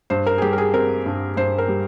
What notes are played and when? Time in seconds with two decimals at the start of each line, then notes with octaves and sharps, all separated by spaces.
0.10 G2 C5
0.27 A#4
0.38 G#4
0.42 G3 G4
0.53 A#4
0.58 G#4
0.74 C4 A#4
1.06 G2
1.37 G2 C5
1.58 A#4
1.68 G3